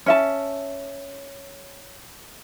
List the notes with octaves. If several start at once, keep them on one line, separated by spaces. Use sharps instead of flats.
C#4 E5 A5